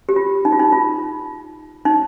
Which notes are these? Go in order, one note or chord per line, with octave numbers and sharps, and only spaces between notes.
G4
F4
D#4
F4
D#4
F4
D#4